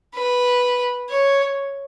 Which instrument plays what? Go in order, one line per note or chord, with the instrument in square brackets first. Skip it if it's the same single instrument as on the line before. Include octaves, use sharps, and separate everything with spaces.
[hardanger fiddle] B4
C#5